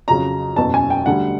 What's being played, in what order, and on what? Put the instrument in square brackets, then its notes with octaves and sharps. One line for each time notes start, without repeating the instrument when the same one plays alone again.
[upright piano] F2 C#3 F#3 A#5
F#1 E2 B2 F#3 A5
G#5
G5
D2 D3 G3 F#5